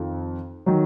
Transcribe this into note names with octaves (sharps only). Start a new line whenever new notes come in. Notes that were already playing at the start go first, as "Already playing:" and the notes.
Already playing: F2 D#3
D#3 F#3